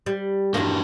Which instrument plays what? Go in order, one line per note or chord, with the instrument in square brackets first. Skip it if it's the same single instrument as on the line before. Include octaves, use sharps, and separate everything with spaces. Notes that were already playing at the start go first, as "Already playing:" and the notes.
[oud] G3
[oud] E2 G2 A#3 [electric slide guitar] D4 F#4 G4